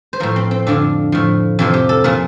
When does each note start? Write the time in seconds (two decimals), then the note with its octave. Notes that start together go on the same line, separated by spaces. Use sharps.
0.13 C5
0.20 A2 F3 A#4
0.36 C4
0.51 C4
0.67 F2 D3 F3 D4
1.12 A2 F3
1.59 F2 C3 F3
1.74 G4
1.89 A4
2.04 A#2 F3 A#4